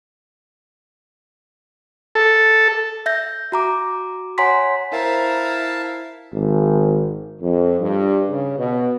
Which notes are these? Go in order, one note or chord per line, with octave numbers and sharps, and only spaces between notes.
A4
E5 G6 A#6
F#4 A#5 D6
C#5 F#5 G#5 A#5 C6 B6
E4 A#4 C5 F5 A5 A#5
G#1
F2
G2
C#3
B2